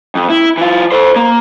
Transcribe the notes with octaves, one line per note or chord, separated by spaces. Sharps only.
F2
E4
E3 F4
A4 C5
A#3